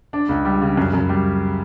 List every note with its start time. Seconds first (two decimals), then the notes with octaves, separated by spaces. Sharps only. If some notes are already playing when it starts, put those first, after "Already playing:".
0.13 D4
0.29 C#2
0.45 G3
0.62 C#3
0.77 F#2
0.94 F#2
1.09 G3